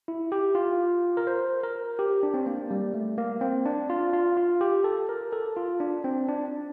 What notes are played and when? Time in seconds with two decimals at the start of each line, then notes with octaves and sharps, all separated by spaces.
0.08 E4
0.32 G4
0.55 F4
1.17 A#4
1.27 C5
1.63 A#4
1.99 G4
2.23 D4
2.34 C4
2.46 A#3
2.71 G3
2.94 A3
3.18 A#3
3.41 C4
3.66 D4
3.90 F4
4.13 F4
4.37 F4
4.61 G4
4.84 A4
5.09 A#4
5.33 A4
5.56 F4
5.80 D4
6.04 C4
6.28 D4